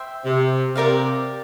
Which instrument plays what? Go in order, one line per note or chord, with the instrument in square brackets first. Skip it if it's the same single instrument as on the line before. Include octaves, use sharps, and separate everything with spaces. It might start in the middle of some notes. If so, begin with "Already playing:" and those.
Already playing: [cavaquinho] C5 E5 G5
[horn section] C3
[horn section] C3 [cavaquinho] G4 A#4 D5 F5